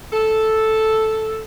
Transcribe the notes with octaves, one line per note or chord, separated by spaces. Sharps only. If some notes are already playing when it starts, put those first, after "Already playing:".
A4